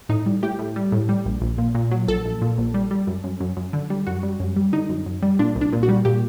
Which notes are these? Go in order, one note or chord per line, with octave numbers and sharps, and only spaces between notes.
A2 D#4
G3
A2 G4
A2
G3
A2
G3
A#1
A#1
A#2
A#2
F#3
A#1 A4
A#1
A#2
A#1
G3
G3
F#2
F#2
F#2
F#2
D3
G3
F#2 F#4
G3
F#2
G3
D3 D#4
F#2
F#2
G3
A#2 D4
C2
D4
A#2
F#4
G3
A#2 G4